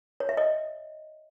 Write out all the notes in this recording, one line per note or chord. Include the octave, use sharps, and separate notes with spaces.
C#5
E5
D#5